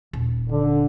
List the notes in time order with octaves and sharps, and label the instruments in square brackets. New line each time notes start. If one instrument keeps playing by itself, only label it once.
[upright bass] D#1
[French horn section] D3